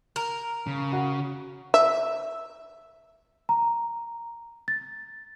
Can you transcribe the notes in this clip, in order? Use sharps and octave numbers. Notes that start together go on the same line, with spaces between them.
A#4
C#3
F#4
E5
A#5
A6